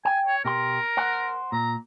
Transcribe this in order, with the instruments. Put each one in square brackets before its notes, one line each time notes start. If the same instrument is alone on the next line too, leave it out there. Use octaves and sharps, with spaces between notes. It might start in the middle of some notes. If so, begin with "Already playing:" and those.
[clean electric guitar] G5 [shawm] G#5
[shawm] C#5
[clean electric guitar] B2 G4 C6 [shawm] A#4
[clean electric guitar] C5 F#5
[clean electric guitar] A#2 [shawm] A#5